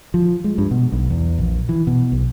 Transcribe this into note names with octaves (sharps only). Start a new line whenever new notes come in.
F3
G#3
G2
B2
B1
E2
A#1
E3
B2
B1